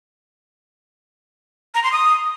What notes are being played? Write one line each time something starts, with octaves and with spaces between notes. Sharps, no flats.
A#5
C6
D#6